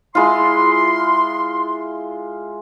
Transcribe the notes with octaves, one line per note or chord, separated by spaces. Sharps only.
G#3 E4 F4 C6